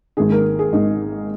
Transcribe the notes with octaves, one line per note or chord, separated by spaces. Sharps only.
G#1 G#2 D#3 G#4
A#4
G#4
G#1 G#2 D#3 D#4